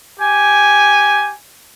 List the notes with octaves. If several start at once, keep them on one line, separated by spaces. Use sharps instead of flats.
G4 G#5